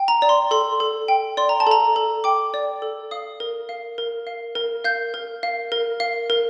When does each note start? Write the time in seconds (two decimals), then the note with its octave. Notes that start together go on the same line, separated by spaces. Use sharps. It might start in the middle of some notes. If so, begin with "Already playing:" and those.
Already playing: G5
0.08 A#5
0.22 D5
0.29 C6
0.51 A4 C6
0.80 A4
1.08 G5
1.37 D5 C6
1.49 A#5
1.60 A5
1.67 A4 A#5
1.96 A4
2.24 G5 D6
2.54 D5
2.82 A4
3.11 F5 D#6
3.40 A#4
3.69 F5
3.98 A#4
4.27 F5
4.55 A#4
4.84 F5 G6
5.14 A#4
5.43 F5
5.72 A#4
6.00 F5
6.30 A#4